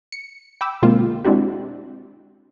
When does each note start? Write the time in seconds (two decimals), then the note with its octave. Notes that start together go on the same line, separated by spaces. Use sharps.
0.12 C#7
0.61 G5 B5 D6 E6
0.82 B2 D3 G#3 A#3 C4 F4
1.25 G#3 C4 D4 E4 F#4 G4